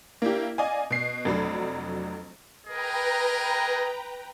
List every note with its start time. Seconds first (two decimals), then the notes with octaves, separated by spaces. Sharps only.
0.22 A#3 D4 E4 G4
0.58 D5 D#5 F5 G#5
0.90 B2 C7
1.25 F1 F2 F#3 A3 D4 B5
2.66 G#4 A#4 B4 D#5 G5 A#5